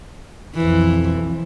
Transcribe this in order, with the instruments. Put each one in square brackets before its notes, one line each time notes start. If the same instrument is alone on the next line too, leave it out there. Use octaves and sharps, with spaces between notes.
[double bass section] B1 F2 [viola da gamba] E3